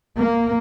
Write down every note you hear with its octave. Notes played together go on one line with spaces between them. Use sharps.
A#3